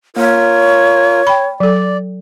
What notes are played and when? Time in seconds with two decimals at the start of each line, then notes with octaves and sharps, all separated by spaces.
0.16 A#3 F4 A#4 C#5
1.27 G5 B5
1.60 F#3 A4 D5